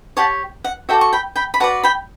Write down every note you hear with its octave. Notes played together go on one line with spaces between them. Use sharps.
G4 C#5 F#5 A5
F#5
F#4 A4 D5 E5 G5
C#6
G5 B5
G5 B5
B5
F#4 B4 D5 F#5 A5
G5 B5